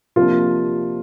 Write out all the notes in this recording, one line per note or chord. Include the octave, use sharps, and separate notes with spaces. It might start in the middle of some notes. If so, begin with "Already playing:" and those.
C3 F3 A#3 D4 F4